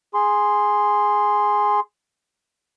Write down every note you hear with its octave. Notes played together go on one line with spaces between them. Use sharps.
G#4 C6